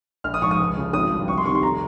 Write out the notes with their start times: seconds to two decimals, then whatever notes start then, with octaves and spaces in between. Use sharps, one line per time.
0.24 A#1 F6
0.34 D#6
0.42 G#2 F3 C#6
0.51 D#6
0.60 C#2
0.77 C#3 F3
0.93 G#1 D#6
1.11 G2 F3
1.28 C2 C#6
1.38 C6
1.45 C3 D#3 C#6
1.55 C6
1.62 F1 A#5